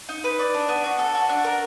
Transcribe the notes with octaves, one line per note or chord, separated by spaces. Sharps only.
D#4
B4
D5
D4
B3
F#4
A4
F#4
D4
A#4